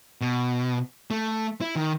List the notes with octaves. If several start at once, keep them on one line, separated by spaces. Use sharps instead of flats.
B2
A3
E4
D#3